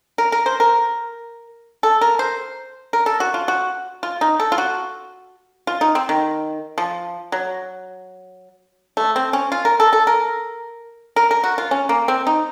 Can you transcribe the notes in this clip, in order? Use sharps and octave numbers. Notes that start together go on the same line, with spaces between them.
A#4
A#4
C5
A#4
A4
A#4
C5
A#4
A4
F#4
F4
F#4
F4
D#4
A4
F4
F#4
F4
D#4
C4
D#3
F3
F#3
A3
C4
C#4
F4
A#4
A4
A4
A#4
A#4
A#4
F#4
F4
C#4
A#3
C4
D#4